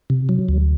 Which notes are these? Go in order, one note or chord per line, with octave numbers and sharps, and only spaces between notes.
C3
F#3
D2